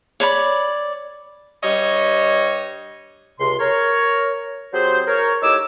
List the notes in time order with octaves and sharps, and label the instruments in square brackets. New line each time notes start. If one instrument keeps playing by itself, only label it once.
[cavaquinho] C#5 D5 B5
[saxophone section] G2 G3 C#5 D#5
[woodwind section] C#2 C3 C6
A#4 C#5
F#3 C4 G4 G#4 C5
A#4 C#5
A2 D#4 G4 C#5 D6 E6